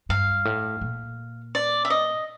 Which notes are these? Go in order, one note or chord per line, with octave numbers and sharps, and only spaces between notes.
G2 F5
A2
A#2
D5
E5
D#5